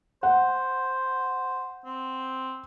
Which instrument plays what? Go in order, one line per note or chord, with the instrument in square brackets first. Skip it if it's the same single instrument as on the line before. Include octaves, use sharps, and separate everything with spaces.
[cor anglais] C5 [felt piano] F#5
[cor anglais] C4